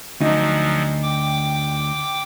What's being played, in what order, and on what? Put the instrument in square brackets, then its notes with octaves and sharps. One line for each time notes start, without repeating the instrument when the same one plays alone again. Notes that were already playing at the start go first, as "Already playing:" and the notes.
[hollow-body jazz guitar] D2 D#4 [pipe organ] F3 F#3
[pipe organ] G5 D6